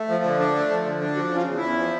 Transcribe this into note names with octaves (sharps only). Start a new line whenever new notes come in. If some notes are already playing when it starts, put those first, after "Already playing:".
Already playing: A3
F3
D3
D4
A3
F3
D3
D4
F3 F#4
C#3
F4
E2
E4
E2
F3